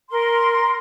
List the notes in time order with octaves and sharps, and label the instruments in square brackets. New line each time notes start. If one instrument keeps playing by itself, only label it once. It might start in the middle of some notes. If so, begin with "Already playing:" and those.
[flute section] A#4 C6